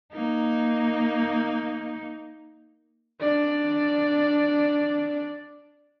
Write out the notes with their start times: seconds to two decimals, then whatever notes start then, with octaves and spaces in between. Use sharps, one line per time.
0.13 A#3 D#4
3.21 D4 D5